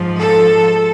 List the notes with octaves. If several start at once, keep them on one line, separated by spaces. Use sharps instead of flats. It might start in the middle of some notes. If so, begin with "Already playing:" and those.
Already playing: G#2 F3
A4